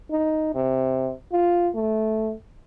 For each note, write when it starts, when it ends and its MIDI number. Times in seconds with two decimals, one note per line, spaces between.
0.11 0.50 63
0.55 1.12 48
1.32 1.69 65
1.75 2.32 57